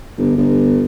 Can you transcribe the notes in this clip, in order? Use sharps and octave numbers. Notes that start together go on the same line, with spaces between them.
G1
G1